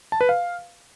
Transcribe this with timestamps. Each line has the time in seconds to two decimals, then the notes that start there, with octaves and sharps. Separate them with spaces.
0.12 A5
0.21 B4
0.29 F5